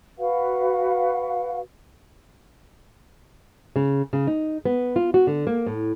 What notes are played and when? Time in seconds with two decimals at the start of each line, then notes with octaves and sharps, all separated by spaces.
0.19 F#4 B4 F5 F#5
3.76 C#3
4.13 C#3
4.27 D#4
4.65 B3
4.96 F4
5.14 F#4
5.27 D3
5.47 A#3
5.66 A2